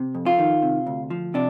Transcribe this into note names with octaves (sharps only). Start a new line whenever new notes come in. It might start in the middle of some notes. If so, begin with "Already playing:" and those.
Already playing: C3
F2
F4
D#3
C3
D2
F3
C3 D4